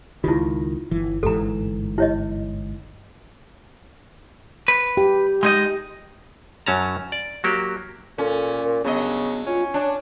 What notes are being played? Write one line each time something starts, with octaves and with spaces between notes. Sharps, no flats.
C#2 D#3 E4 F4
G1 E3
G1 G#2 E3 A4 A#5
E4 C#5 D#5
B4
G4
G#3 D#4 D#5
F#2 F#3 C#4 A5 A#5
D5
F#3 A#3 F#4 G4
A#2 C#4 A4
A#4
G2 C#3 F#3 B3 D#5
C#4 F4
D4 C#5